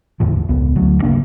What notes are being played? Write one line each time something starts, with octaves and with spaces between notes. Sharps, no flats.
E2 A2 D3 F3
C#2 B3
D2 F#3
G1 C#3 A#3 D4